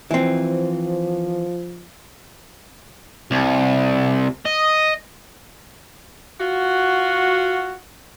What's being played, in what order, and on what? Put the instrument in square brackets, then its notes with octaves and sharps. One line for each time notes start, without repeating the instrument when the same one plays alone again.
[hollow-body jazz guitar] E3 C4 [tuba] F3
[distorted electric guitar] C2
D#5
[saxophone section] F4 F#4